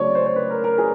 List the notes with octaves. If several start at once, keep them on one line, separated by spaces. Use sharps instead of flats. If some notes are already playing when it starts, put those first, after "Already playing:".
Already playing: C#3 F#3 A3 C4 C#5 D5
C5
C5
B4
A#4
A#4
G#4